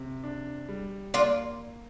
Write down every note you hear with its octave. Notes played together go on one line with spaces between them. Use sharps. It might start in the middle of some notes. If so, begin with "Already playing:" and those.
Already playing: C3
D4
G3
A#3 D4 F4